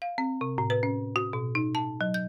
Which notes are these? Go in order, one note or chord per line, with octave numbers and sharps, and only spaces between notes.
F5
C4
C3
A2
B4
C#4
F#4
B2
D#4
A5
F#3
G6